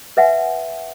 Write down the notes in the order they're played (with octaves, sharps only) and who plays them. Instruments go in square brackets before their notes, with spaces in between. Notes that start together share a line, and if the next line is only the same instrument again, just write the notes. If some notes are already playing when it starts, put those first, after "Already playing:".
[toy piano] B4 E5 F#5 G#5